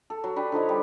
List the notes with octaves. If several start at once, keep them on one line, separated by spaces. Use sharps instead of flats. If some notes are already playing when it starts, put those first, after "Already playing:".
A4
F#3
D4 G4 B4
D3 F3 D#4 C#5
G3